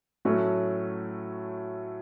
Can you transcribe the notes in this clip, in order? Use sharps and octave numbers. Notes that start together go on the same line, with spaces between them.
A2 F#3 A3 C#4 F#4